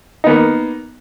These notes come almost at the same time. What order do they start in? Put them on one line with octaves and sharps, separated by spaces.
D#4 B3 A#3